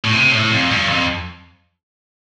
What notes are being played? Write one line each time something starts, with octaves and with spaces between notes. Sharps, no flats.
A2
C3
A2
F2
G2
F2